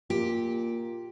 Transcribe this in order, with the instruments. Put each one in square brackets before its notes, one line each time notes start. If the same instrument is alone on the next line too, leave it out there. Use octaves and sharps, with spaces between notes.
[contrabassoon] A#2 [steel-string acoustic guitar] G4